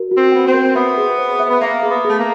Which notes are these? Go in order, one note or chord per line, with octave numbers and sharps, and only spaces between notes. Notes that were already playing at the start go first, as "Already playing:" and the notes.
Already playing: F#4 A#4
F#4
C4
B3 G5
C4
A#4
B3 E5
G#4
C5
E5
B3
A#3 E5
G#4
B3
A3 G#4
A#3